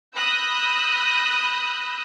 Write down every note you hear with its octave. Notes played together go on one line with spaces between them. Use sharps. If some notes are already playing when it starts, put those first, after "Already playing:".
B5 D#6 E6 F#6 G6 A#6